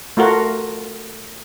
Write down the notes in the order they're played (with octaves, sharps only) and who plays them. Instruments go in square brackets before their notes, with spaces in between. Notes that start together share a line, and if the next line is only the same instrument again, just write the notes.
[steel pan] A3 F4 F#4 A#4